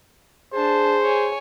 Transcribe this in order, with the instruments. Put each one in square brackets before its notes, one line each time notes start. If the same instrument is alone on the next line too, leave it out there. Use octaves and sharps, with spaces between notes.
[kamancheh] D4 A5 [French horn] G#4 [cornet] C5
[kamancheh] C#5 G#5